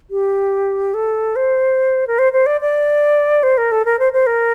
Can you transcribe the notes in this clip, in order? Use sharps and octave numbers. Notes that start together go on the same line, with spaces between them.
G4
A4
C5
A#4
C5
C5
D5
D5
C5
A#4
A4
A#4
C5
C5
A#4